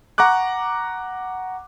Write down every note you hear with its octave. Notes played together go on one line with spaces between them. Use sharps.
F#5 A#5 C#6 D6 F#6